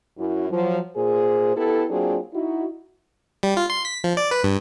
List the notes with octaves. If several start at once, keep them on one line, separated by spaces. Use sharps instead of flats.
F#2 E4
F3 F#3
A#2 G#4 C5
B3 E4 G4 A4
F#3 A#3 C4 D4 F4 G#4
D#4 E4 F#4
G3
F4
C6
B6
F3
D5
B4
G2